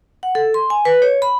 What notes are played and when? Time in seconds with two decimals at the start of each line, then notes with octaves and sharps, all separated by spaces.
0.23 F#5
0.35 A4
0.54 C6
0.70 G#5
0.85 B4
1.02 C#5
1.22 B5